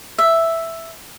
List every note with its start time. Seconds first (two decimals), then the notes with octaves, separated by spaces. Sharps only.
0.18 E5